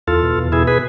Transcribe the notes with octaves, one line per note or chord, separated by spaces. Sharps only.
E2 F4 A4
B2
E2
B2 E4 G#4
G#4 B4